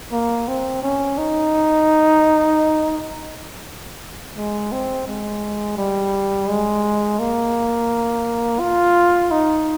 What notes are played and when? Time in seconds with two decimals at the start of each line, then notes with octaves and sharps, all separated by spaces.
0.12 A#3
0.48 C4
0.83 C#4
1.18 D#4
4.37 G#3
4.72 C4
5.07 G#3
5.77 G3
6.48 G#3
7.19 A#3
8.60 F4
9.31 D#4